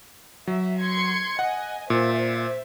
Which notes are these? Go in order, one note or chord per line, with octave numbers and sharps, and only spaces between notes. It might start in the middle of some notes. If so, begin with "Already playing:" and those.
F#3 E5
C6 G#6 C#7
D#5 F#5 G#5
A#2 C5 E5